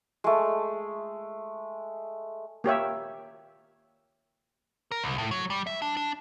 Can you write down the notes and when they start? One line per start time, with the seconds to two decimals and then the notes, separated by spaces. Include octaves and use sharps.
0.24 G#3 A3
2.64 A#3 G4 C#5 E5
4.92 A#4
5.04 C2
5.18 A2
5.31 F#3
5.50 G3
5.67 E5
5.82 D4
5.97 D4